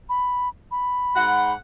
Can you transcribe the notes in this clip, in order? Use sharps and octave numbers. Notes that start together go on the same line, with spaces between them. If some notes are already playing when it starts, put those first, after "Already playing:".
B5
B5
G#2 F#5